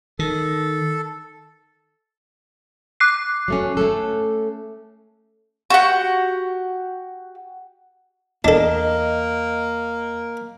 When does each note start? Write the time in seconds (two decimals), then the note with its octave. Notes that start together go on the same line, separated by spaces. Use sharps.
0.19 D#3 A4
3.00 D6 F#6 C7
3.48 F#3 A3 C#4
3.77 A3 C#4 A4
5.70 F#4 G4 F#5
8.44 E2 A#3 D4 A4 D#5